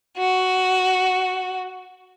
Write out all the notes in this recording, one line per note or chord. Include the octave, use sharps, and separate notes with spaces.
F#4